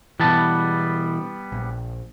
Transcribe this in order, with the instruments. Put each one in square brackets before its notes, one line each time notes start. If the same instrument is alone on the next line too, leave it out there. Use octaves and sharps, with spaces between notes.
[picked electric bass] B2 E3 [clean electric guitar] G3 B3 A5
[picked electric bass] A#1